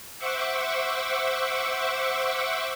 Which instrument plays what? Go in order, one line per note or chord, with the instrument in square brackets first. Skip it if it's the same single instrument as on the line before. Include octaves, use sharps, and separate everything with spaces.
[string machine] C5 E5 F#5 C#6 D6 E6